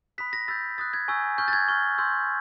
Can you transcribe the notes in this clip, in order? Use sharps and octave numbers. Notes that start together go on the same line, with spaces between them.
B5 D#6 F#6 B6
A#6
B5 E6 G6 A6
B5 D#6 F#6 A6
G#6
G#5 C#6 E6 G6
C#6 F6 G6
A6
G#6
C#6 F6
C6 E6 G6